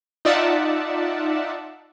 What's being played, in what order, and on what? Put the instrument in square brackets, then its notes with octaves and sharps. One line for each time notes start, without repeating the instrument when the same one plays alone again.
[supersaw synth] D#4 F4 D5 E5 F#5 A5